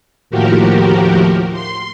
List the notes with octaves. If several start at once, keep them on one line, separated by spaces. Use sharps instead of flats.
D#2 A2 F3 F#4 G4 A#4
C6